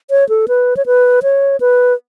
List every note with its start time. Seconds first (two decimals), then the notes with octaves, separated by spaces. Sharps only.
0.10 C#5
0.29 A4
0.48 B4
0.77 C#5
0.86 B4
1.23 C#5
1.60 B4